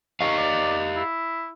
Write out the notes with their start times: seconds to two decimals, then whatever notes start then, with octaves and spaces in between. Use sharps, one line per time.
0.21 G4 D#5 F5 C#6
0.38 D5
0.96 E4